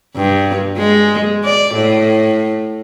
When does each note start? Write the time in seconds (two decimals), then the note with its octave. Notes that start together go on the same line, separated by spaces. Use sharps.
0.16 G2
0.77 G#3
1.44 D5
1.74 A2